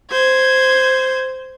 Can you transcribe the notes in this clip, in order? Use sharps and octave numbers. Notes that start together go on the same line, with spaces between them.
C5 G#6